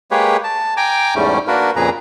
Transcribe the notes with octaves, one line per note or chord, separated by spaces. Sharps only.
G#3 A#3 G4 G#4 B4 C#5
A5
G5 G#5 A#5 D6
E2 G#2 G3 A3 C#4
A#3 D4 F#4 A#4 B4
F2 A#2 C#3 G#4 B4 A#5